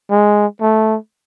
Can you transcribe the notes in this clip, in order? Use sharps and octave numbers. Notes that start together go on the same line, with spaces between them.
G#3
A3